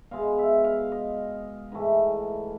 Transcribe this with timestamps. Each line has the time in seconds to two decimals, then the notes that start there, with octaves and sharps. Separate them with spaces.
0.11 B2 G#3 F5
0.38 E5
0.64 F5
0.92 D#5
1.72 G#2 E3 A3